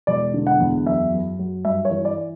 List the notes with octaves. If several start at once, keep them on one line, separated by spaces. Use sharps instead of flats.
E1 D5
D3
F#5
E2
F#2 E5
F#2
F#3
G2 E5
C#5
E3
D5